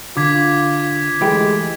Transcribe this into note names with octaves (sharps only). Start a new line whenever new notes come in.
D3 F4 D6 G#6 B6
E3 G#3 A3 G4